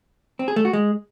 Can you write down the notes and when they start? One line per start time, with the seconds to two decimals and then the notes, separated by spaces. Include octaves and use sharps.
0.39 C4
0.48 G#4
0.56 A3
0.65 F#4
0.73 G#3